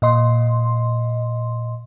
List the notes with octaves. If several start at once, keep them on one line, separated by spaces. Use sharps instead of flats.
A#2 D#5 C6